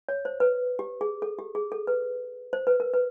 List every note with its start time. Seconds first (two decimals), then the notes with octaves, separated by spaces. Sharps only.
0.09 C#5
0.25 C5
0.40 B4
0.79 G4
1.01 G#4
1.22 A4
1.39 G4
1.55 G#4
1.72 A4
1.87 B4
2.53 C5
2.67 B4
2.80 A#4
2.94 B4